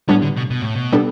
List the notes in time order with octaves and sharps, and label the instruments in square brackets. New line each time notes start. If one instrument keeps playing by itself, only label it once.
[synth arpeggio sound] A2 G3 B3 D4 [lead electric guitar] C#4
[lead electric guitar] D3
B2
B2
A2
B2
[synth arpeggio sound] G3 B3 D4 A4